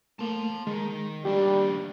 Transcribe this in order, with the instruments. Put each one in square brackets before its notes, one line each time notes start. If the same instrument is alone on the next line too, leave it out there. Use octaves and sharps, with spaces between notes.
[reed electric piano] A3 A#3 [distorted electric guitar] A5 C6
[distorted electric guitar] D#3 [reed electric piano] G#3
[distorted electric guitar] D#2 D4 [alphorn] G3 [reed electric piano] G4